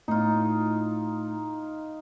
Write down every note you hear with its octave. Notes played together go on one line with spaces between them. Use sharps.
A2 D#4 F4